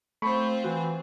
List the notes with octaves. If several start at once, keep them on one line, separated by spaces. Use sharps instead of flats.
A3 C4 F4 C5 B5 C#6
E3 F#4